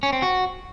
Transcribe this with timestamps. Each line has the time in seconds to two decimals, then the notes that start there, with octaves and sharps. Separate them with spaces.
0.03 C#4
0.13 C4
0.22 F#4